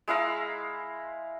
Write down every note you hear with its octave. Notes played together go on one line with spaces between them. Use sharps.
G#3 E4 F5 A#5